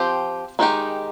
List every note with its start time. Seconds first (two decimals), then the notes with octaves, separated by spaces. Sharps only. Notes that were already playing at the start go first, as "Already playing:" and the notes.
Already playing: F3 C4 G4 C5
0.59 D#3 G#3 D#4 G4